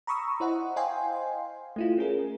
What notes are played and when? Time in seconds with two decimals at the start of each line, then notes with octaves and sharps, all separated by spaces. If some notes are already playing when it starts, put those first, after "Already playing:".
0.07 A#5 B5 C#6 D#6 E6
0.40 E4 C5 D#5 F#5
0.76 C5 D#5 F5 G5 G#5 C6
1.76 A3 E4 F4
1.98 C#4 G#4 A#4